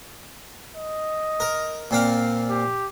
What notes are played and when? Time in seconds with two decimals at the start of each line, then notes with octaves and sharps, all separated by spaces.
0.77 D#5
1.40 A#4
1.91 A#2 C4 F5
2.50 G4